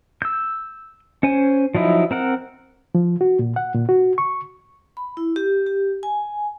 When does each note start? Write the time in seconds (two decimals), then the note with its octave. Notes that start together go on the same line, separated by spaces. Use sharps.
0.22 E6 G6
1.23 C#4 C5 G#5
1.74 F3 F#3 D#4 E4
2.11 C4 A#4 F#5
2.95 F3
3.21 F#4
3.39 A#2
3.56 F#5
3.74 A#2
3.89 F#4
4.18 C#6
4.97 B5
5.17 E4
5.36 G4
5.66 G4
6.03 G#5